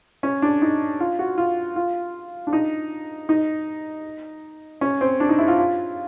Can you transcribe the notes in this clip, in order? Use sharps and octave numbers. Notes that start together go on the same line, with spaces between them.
C#4
D4
D#4
F4
F#4
F4
F4
D4
D#4
D#4
C#4
C4
D4
D#4
E4
F4
F4